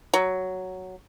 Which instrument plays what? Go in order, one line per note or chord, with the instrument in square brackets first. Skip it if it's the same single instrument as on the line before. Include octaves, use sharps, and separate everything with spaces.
[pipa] F#3